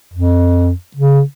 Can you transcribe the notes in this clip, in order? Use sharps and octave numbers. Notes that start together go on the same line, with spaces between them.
F2
C#3